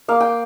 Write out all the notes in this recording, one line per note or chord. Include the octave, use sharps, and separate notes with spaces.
A#3 F5
G5